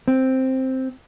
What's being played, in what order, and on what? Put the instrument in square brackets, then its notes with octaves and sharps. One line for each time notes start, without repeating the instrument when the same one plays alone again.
[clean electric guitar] C4